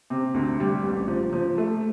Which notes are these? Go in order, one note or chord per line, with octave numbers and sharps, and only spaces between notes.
C3
D2
G3
A1
F3
F3
A3